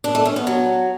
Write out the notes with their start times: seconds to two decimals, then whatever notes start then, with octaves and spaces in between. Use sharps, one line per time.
0.04 D4
0.15 A3
0.25 C#4
0.36 B3
0.47 F#3